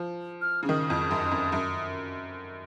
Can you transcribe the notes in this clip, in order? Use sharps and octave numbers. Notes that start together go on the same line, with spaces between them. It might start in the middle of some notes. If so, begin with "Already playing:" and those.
Already playing: F3
F6
C#3
D#3 D#6
F2
F#2
F2
F#2